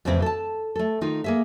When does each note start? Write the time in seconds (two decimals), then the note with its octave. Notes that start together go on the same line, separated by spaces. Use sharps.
0.05 F2 A2 C#3 E3 C4 E4
0.22 A4 A5
0.76 A3 A4
1.01 D#3 D#4 F4
1.24 A#3 G#4 E5